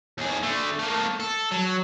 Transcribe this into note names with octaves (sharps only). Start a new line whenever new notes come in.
D#2 G#4
D3 A3
A3 A#3
A4
F#3